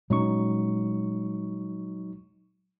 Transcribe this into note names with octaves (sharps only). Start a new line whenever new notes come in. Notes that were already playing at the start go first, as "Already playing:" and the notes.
A#2 F#3 G#3 C#4 D#4 C#6